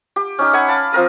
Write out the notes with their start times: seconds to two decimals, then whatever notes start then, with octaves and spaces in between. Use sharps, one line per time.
0.16 G4
0.39 C#4 D#4 G4
0.53 E5 F#5 G#5 B5
0.68 F5 A5 B5 D6
0.92 F3 C4 A#4 D#6